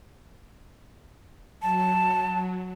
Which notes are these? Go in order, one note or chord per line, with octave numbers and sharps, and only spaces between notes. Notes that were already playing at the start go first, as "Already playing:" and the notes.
F#3 A5